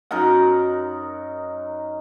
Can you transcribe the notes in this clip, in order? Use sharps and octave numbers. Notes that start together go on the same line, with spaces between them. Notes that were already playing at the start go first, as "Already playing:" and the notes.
F#2 D#4 A#4 F#5